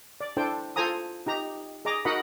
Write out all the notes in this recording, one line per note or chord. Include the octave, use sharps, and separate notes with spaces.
D5
D4 E4 A4 C5 G5 A5
F4 A4 C5 G#5 A#5 D#6
D#4 G4 A#5
G#4 D#5 A#5 D6
D#4 F#4 A#4 D#5 F#5 B5